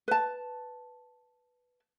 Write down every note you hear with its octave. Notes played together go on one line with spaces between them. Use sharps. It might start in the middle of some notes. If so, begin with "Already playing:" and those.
B4 A5